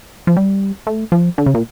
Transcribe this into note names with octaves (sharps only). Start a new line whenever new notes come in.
F3
G3
A3
F3
D3
C#3
A#2